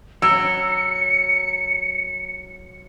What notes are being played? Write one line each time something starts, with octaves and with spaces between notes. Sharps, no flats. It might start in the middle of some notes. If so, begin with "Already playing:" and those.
F#3 E6 C#7